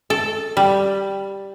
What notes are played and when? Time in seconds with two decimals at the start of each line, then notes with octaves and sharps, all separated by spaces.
0.10 A4
0.57 G3